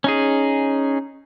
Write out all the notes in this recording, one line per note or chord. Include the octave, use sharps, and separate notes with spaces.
C#4 D#4 G#4